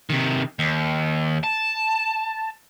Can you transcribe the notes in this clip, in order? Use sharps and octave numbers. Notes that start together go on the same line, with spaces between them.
C3 D#3
D#2
A5